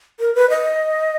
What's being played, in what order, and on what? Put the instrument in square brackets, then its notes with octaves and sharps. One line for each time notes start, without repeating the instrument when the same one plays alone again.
[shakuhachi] A#4
B4
D#5